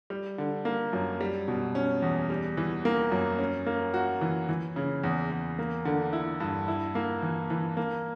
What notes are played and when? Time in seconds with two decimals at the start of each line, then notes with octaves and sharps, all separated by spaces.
0.10 G3
0.38 D3
0.65 A#3
0.93 F#2
1.21 G3
1.48 B2
1.75 C#4
2.02 E2
2.30 G3
2.57 E3
2.85 A#3
3.11 F#2
3.39 C#4
3.66 A#3
3.94 F#4
4.21 E3
4.49 E3
4.76 C#3
5.04 E2
5.31 E2
5.59 A#3
5.85 D3
6.13 E4
6.40 G2
6.68 E4
6.95 A#3
7.22 E3
7.50 E3
7.77 A#3